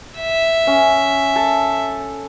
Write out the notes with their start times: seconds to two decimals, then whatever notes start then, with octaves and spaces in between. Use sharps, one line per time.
0.19 E5
0.67 C#4
1.36 A4 A5